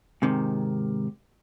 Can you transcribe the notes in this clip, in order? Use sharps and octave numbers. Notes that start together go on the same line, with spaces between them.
G#2 C3 D#3